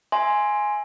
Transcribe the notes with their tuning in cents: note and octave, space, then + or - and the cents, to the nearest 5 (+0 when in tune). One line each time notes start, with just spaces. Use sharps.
E5 +0 G#5 +0 C6 +0